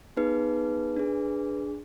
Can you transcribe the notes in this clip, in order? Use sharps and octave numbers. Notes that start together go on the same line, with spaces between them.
B3 D#4 G#4 B4
D4 G#4